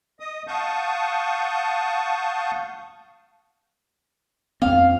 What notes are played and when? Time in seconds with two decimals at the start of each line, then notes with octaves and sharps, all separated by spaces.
0.20 D#5 D#6
0.47 F5 F#5 A5 C#6 D#6 G6
4.62 F2 C4 F5